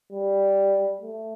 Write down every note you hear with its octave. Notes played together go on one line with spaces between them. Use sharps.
G3
A3